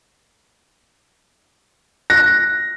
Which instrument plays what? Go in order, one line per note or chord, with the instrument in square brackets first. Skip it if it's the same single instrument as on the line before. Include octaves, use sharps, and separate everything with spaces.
[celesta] F#6 [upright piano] A#6